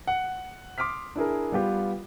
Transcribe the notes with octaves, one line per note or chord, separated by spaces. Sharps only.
F#5
C6 D6 D#6 F6 B6
D4 E4 G#4 A#4
G3 B3 F4 G4 B4